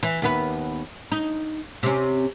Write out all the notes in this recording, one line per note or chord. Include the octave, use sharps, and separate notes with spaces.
E3
D#2 B3 B4
D#4
C3 C#4